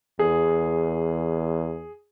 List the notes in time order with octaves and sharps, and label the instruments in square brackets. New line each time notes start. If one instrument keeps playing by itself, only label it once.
[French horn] E2 [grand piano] G#4